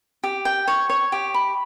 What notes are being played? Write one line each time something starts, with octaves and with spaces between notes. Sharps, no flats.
G4
G5
C#5
C#5
G4
B5